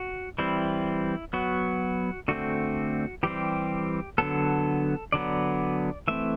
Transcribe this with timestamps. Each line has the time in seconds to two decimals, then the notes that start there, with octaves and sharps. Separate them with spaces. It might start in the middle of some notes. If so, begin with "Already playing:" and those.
Already playing: F#4
0.38 E3 G3 C4 E4
1.33 F#3 B3 F#4
2.28 D3 A3 C4 F#4
3.23 E3 G3 C4 G4
4.18 D3 F#3 B3 A4
5.12 D3 F#3 B3 D5
6.08 E3 A3 C4 E5